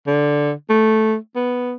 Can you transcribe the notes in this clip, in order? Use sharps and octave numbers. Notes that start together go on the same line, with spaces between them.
D3
A3
B3